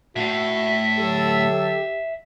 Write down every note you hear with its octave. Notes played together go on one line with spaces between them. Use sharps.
A2 F#4 E5 F#5
D3 F#3 G4 A4